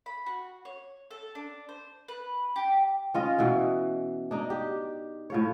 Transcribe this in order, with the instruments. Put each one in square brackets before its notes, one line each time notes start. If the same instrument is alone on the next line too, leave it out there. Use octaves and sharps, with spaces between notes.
[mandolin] B5
F#4
C#5
A4
D4
C5
B4
G4
[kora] C#4 F4 D#5
B2 E3
D4 D#4
G4
A2 F3 C#5